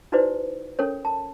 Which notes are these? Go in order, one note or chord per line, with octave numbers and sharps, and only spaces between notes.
D#4 E4 F#4 B4 C5 D5
C#4 A4 A#4 C#5
A5